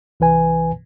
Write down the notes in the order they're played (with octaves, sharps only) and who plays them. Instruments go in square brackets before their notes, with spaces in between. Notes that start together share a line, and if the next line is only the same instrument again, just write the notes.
[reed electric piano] C2 E3 B4 G#5